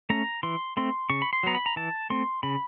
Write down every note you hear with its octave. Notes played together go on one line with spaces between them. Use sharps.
A3 C#4 A#5
E3 C6
A3 C4 C6
C#3 C#6
B5
C6
F#3 B3 A#5
B5
A#5
E3 A5
A3 C4 C6
C#3 B5